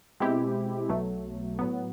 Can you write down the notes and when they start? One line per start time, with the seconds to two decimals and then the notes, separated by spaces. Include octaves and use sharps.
0.20 B2 G#3 C4 E4 G4
0.89 B1 B2 F#3 A3
1.59 A2 F#3 B3